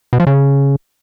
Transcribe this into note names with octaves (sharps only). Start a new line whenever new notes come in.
B2
F3
C#3